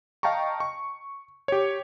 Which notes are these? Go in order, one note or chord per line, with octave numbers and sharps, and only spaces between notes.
D#5 F5 G5 A5 A#5 C#6
C#6
G4 C#5